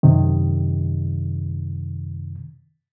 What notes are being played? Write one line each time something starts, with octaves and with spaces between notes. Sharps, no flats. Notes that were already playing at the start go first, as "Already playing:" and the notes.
F#2 C3 D#3